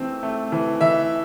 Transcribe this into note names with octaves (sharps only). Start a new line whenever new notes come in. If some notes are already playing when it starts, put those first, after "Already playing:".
Already playing: E3 A3 C4
A3
E3
E3 E5